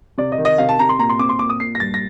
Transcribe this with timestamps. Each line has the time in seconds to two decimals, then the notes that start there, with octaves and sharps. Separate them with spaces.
0.18 C3 D5
0.32 D#5
0.38 D#3
0.45 D#5
0.58 C3 F5
0.69 A5
0.79 C3 A#5
0.89 C6
0.99 A#2 A#5
1.09 C6
1.19 C4 D6
1.29 C6
1.39 A#2 D6
1.50 D#6
1.60 A#2 C7
1.75 A#6
1.80 G2 A6
1.94 A#6